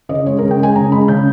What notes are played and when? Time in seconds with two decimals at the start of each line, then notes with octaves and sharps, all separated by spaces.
0.09 C#3 D#5
0.26 G#3 C#5
0.38 A#4
0.42 C#3
0.51 G5
0.59 G#3 G#5
0.76 C#3 A#5
0.92 G#3 B5
1.08 C#3 G6